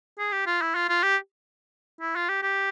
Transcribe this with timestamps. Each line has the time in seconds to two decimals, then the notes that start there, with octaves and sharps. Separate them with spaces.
0.19 G#4
0.32 G4
0.47 F4
0.62 E4
0.75 F4
0.89 F4
1.04 G4
2.01 E4
2.16 F4
2.29 G4
2.43 G4